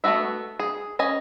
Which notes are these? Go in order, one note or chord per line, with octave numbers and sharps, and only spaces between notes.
A3 B3 C#4 F#4 E5
G#4
C#4 D#5 G#5